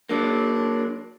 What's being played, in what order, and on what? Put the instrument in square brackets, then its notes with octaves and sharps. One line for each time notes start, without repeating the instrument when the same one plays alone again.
[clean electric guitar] F#3 A#3 [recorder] D4